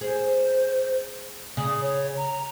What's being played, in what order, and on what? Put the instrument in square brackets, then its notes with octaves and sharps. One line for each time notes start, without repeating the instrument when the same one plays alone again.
[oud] G#4 [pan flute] C5
[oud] C#3 [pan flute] D#6
[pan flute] C#5
A#5